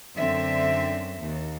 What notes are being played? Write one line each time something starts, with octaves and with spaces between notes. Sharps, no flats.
F#2 D3 C4 E5
D#2